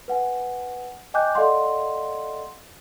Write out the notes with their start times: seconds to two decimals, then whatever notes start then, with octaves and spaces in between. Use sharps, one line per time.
0.08 B4 F#5 G#5
1.14 D#5 G5 G#5 D6 F#6 G6
1.35 A4 D5 D#5 F5 F#5 C6